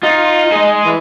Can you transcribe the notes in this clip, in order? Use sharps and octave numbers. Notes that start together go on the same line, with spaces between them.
D#4 F4
G#4 D#5
E3